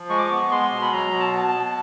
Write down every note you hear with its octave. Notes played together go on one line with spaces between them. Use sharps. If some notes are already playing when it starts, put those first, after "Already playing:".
Already playing: F3
G#3 C#6
D6
B3 C#6
G#3 C6
B2
B5
F#3 A#5
B2
A5
B3
A5
B2